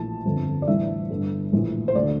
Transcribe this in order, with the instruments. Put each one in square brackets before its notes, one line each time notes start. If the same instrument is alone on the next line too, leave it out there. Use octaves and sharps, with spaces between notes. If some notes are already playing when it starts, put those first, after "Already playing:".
Already playing: [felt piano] A#1 A2 E3 A5
G1 F2 D3
D5
A1 G2 E3 E5
G1 G2 D3
A#1 A2 E3
C5
D2 D3 D5